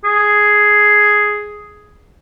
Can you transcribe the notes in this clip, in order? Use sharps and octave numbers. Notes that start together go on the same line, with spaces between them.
G#4